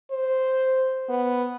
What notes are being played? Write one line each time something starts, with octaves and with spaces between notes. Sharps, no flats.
C5
B3